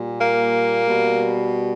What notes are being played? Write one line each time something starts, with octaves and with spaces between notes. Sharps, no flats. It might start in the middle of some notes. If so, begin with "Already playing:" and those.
Already playing: A#2 G3
A#3
B2 G3